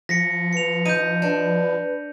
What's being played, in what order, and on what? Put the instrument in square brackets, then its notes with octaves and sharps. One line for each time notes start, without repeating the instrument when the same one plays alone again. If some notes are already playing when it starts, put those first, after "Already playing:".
[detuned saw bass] F3 [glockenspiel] A#6 B6 C#7
[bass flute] B4 [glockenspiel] C#7 F7
[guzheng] D#4 [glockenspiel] G6 D#7
[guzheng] D4 [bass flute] B4